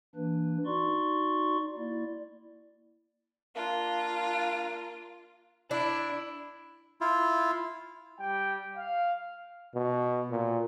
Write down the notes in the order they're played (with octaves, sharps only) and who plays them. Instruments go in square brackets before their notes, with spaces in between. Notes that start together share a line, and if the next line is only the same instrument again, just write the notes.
[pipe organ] E3 A#3 D4 B4
D#4 F#4 D5 C6 C#6
A#3 E4 D5
[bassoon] A#3 [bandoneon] D4 [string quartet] F4
[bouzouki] D4 [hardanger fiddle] E4
[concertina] E4 F4
[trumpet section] G3 G5
F5
[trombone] B2
A#2